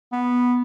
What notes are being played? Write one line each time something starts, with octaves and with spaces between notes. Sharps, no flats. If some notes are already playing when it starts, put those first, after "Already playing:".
B3